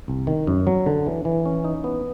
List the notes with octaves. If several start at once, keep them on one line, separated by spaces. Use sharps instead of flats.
C2
D#3
F#2
F#3
D3
E3
E3
C#4
D#4
B3